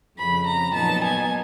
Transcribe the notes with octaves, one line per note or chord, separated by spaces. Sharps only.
F2 C#3 F3 B5
A#5
A#2 F#3 B3 D#4 A5
G#5